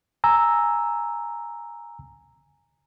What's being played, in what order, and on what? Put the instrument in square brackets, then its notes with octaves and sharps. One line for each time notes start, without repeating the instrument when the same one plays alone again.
[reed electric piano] G#5 A#5 E6